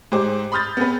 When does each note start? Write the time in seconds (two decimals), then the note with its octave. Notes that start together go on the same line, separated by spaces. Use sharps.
0.12 G#2 G4 G#4 C5 D6
0.52 B5 C6 D#6 F6 G6 A6
0.77 B3 C4 G#4 B4